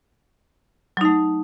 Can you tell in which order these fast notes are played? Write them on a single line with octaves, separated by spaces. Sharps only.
F#3 D#4 A3